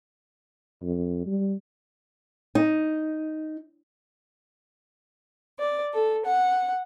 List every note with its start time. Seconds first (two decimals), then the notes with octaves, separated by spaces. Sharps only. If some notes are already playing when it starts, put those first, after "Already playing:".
0.82 F2
1.26 G3
2.55 D#4
5.58 D5
5.93 A4
6.26 F#5